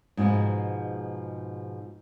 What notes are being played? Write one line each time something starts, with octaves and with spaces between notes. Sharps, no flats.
G#2 B2 E3 F3 G#3